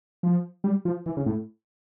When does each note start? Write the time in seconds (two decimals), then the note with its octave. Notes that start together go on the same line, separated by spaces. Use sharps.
0.23 F3
0.64 G3
0.85 F3
1.06 E3
1.17 C#3
1.26 A2